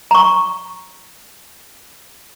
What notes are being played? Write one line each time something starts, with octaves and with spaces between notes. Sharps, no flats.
A#5 C#6